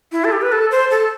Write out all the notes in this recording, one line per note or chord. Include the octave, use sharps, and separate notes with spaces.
E4
A4
G4
B4
A4
C5
A4